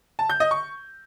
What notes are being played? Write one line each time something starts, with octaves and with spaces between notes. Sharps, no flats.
A5
G6
D#5
C#6